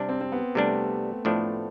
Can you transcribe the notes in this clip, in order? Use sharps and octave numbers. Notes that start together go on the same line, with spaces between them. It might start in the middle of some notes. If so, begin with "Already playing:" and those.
Already playing: C3 G3 D4
C4
C4
B3
C3 G3 A3 D4
A2 F3 A3 D4